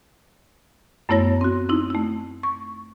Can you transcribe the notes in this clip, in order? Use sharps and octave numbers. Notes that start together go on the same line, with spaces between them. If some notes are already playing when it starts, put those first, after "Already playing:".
F#2 A3 B3 E4 C#5 A#6
C4 F#4
C4 D#4 E4
A3 E4
C#6